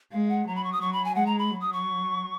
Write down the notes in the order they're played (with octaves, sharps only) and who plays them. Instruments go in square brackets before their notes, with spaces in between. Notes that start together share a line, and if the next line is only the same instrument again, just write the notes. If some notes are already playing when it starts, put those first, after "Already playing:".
[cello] G#3 [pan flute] F5
[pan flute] F#5
[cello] F#3 [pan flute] A#5
[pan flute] B5
C#6
D#6
[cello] F#3 [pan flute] C#6
[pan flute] B5
G#5
[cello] G#3 [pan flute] F#5
[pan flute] A#5
B5
[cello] F#3
[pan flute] D#6
C#6